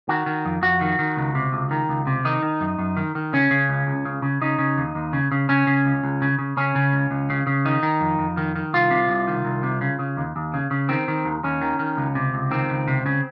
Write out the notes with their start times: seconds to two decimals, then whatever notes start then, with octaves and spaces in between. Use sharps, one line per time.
0.09 D#3 F#4
0.26 D#3
0.45 F2
0.62 F2 F#4
0.81 D#3
0.99 D#3
1.17 C#2
1.35 C3
1.53 C#2
1.71 D#3
1.89 C#2
2.07 C3
2.25 D#3 D#4
2.43 D#3
2.61 F#2
2.79 F#2
2.97 D#3
3.15 D#3
3.33 C#3 C#4
3.51 C#3
3.69 C#2
3.87 C#2
4.05 C#3
4.22 C#3
4.41 C#3 D#4
4.58 C#3
4.78 D#2
4.95 D#2
5.13 C#3
5.32 C#3
5.49 C#3 C#4
5.67 C#3
5.85 C#2
6.03 C#2
6.22 C#3
6.39 C#3
6.57 C#3 C#4
6.76 C#3
6.93 C#2
7.11 C#2
7.30 C#3
7.47 C#3
7.65 D#3 D#4
7.83 D#3
8.01 F2
8.19 F2
8.37 D#3
8.56 D#3
8.74 C2 F4
8.91 C3
9.09 C2
9.27 D#3
9.45 C2
9.63 C3
9.81 C#3
9.99 C#3
10.17 D#2
10.36 D#2
10.54 C#3
10.71 C#3
10.89 D#3 C4
11.08 D#3
11.25 D#2
11.44 D#2 C#4
11.61 D#3
11.79 D#3
11.97 C#2
12.15 C3
12.34 C#2
12.51 D#3 C4
12.70 C#2
12.88 C3
13.06 C#3